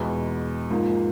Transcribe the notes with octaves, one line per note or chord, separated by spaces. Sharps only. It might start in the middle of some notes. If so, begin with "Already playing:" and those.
Already playing: E2 B2 G#3 B3
G#2 F3 A#3